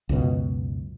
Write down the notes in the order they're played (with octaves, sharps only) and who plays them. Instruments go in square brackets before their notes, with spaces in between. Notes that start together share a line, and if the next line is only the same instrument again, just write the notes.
[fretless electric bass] C#2 F#2 B2